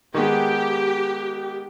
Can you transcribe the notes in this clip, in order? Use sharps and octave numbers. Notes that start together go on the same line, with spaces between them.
D#3 G#3 B3 G4